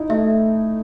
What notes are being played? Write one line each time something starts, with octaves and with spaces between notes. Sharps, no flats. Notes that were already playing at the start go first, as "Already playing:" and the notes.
Already playing: D#4 E4
A3 E5